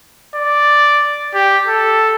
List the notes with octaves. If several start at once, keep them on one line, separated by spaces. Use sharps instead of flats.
D5
G4
A4